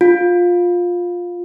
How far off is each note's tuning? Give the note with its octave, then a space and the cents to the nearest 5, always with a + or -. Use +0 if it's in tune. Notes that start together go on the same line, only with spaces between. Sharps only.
F4 +15